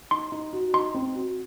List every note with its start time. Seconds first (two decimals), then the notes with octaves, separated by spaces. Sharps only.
0.11 D#4 C6
0.32 D#4
0.53 F#4
0.74 D#4 C6
0.95 C4
1.15 F#4